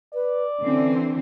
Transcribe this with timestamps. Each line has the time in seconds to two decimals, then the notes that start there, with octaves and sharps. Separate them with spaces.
0.14 B4 D5
0.63 D3 E3 C4 C#4